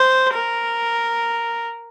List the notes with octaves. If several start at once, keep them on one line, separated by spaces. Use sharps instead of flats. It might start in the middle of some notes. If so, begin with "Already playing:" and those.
Already playing: C5
A#4